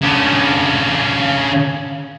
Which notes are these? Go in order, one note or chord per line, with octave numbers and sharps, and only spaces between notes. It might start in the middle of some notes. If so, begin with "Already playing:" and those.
C#3 D4